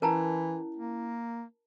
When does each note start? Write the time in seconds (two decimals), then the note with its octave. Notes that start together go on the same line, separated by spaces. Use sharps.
0.02 E3 C#4 E4 A#4 A5 A#5
0.76 A#3